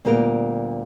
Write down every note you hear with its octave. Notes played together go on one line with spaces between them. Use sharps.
D2 A#2 G3 B3 G4 A#4